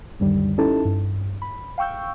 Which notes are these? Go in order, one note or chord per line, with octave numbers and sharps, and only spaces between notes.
C#2 F#2 D3 D#3 G3
C#4 D#4 E4 G4 A4 A5
G2
B5
F5 G5 C#6 E6 G6